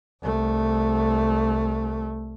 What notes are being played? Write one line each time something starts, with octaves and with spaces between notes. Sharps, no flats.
C2 A3